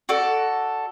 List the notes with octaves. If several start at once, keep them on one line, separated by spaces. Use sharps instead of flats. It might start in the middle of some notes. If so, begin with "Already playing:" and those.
F#4 A4 D5